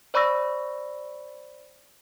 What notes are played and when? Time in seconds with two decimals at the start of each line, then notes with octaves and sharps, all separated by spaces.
0.14 C5 D5 B5 C#6 E6 A#6